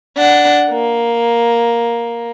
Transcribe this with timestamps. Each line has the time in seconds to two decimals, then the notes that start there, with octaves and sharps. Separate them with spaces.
0.17 D4 F#5
0.69 A#3